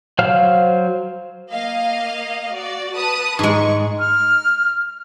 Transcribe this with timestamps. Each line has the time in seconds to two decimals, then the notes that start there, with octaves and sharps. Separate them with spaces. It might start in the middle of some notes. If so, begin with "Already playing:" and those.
0.19 F#3 C5 F5 F6
1.51 A#3 D#5 F5
2.52 F#4 D5
2.95 B4 A5 D#6
3.39 G#2 G#3 C#6
3.99 F6